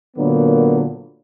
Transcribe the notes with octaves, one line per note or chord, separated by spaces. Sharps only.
A#2 D3 F#3 A#3 B3